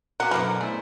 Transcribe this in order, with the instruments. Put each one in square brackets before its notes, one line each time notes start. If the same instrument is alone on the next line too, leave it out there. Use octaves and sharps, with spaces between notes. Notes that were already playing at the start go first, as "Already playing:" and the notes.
[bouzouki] A#2 B3 F#4 [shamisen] A#3 A#4 [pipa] F#5
[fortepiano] F#2 [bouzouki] B2 D3 C4 [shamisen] D4 E4 B4 [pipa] A#4
[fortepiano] A3 E4 C5 [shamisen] G#4